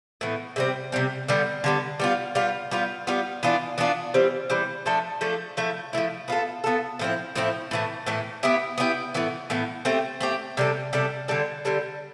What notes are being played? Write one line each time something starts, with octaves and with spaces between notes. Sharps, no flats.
A2 E3 B3
C3 G3 C4
C3 G3 C4
D3 G3 B3
D3 G3 B3
G3 B3 F4
G3 B3 F4
G3 B3 F4
G3 B3 F4
E3 B3 D4 F4
E3 B3 D4 F4
E3 G3 C4
E3 G3 C4
F3 A3 D4 A4
F3 A3 D4 A4
F3 A3 E4
F3 A3 E4
B3 F4 A4
B3 F4 A4
A2 F3 C4 E4
A2 F3 C4 E4
A2 E3 A3
A2 E3 A3
B3 E4 G4
B3 E4 G4
A2 E3 B3
A2 E3 B3
A3 C4 G4
A3 C4 G4
C3 G3 D4 A4
C3 G3 D4 A4
D3 G3 D4 A4
D3 G3 D4 A4